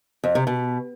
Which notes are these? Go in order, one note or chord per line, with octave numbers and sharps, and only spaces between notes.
F2
C3
B2